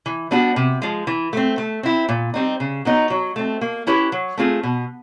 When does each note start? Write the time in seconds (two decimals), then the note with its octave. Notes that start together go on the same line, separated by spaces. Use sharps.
0.06 E3
0.31 G3 B3 D4 F#4
0.56 C3
0.82 F3 G#3
1.07 E3
1.33 A3 C4
1.58 A3
1.83 C4 E4
2.09 A#2
2.34 G3 C4 D#4
2.60 C#3
2.85 F#3 B3 D#4
3.10 F#3
3.36 A3 C4
3.61 A#3
3.87 C#4 E4 G4 B4
4.12 F#3
4.37 A3 C4 F4 G#4
4.63 B2